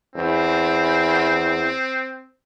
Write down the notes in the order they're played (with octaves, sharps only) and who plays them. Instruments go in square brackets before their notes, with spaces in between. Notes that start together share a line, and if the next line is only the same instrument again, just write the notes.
[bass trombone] E2 [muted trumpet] C4